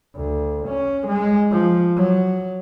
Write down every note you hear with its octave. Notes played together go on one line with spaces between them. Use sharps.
D2
C#4
G#3
F3
F#3